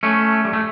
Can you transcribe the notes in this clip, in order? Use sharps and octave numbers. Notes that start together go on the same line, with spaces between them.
A3 C#4
G3
A3